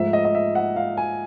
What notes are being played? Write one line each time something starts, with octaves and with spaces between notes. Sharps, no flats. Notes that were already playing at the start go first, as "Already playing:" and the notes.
Already playing: G#2 F3 A3 E5
D#5
D#5
E5
F#5
F5
G#5